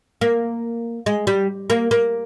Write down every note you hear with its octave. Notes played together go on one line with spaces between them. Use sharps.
A#3
G#3
G3
A#3
A#3